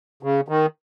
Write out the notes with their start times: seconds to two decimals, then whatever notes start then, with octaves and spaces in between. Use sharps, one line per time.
0.23 C#3
0.48 D#3